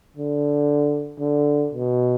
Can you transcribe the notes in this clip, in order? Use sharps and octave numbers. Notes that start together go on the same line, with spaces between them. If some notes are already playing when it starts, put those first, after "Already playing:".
D3
D3
B2